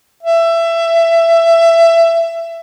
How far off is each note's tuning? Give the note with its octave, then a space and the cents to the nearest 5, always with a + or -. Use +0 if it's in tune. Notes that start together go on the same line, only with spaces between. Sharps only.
E5 +20